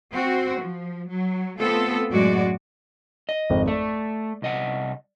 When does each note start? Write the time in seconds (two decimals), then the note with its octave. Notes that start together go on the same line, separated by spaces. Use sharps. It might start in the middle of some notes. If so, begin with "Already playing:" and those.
0.12 C4 F#4
0.60 F3
1.08 F#3
1.59 A3 B3 C4 F4 A4
2.10 F#2 A2 G#3 F#4 D5
3.29 D#5
3.50 G#1 F2
3.68 A3 D5
4.42 C2 D#5 F#5